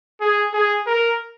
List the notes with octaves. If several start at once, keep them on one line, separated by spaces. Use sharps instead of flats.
G#4
G#4
A#4